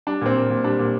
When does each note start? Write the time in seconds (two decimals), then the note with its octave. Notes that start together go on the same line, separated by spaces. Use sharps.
0.07 G3 D4
0.21 A#2 C4
0.36 A#3
0.50 A#2
0.64 G3 D4
0.79 A#2